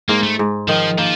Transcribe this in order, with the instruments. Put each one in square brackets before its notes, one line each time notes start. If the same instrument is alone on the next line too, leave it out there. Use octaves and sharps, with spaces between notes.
[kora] G#2 [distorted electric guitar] A#3
[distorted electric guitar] A3
[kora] G#2
[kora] D#3 [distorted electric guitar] F3
[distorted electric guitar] F3 [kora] A#3